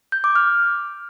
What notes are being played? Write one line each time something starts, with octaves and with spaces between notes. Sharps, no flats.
G6
D6
F6